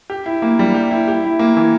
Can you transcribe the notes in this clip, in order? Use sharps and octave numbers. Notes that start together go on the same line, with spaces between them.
G4
E4
A#3
G3
G4
E4
G4
E4
A#3
E3